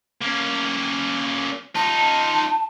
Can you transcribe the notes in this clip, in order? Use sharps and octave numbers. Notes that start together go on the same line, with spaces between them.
A#3 C#4
D#4 F4 A5